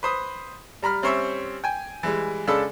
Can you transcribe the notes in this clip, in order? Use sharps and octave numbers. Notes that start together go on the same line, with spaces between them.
B4 C5 D#6
G3 A#5 B5 F6
G3 C4 C#4 C5 C#5 E5
G5 G#5
E3 G3 G#3
C#3 G#3 D4 A4 B5 E6